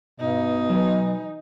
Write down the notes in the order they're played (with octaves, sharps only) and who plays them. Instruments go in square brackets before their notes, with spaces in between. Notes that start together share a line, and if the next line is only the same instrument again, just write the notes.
[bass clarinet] G2 [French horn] B2 [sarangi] D#4
[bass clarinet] E3 [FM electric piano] F#3